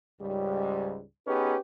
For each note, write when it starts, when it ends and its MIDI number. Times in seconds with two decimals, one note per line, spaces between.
0.21 1.01 37
0.21 1.01 44
0.21 1.01 55
1.27 1.56 59
1.27 1.56 61
1.27 1.56 63
1.27 1.56 67
1.27 1.56 68
1.27 1.56 71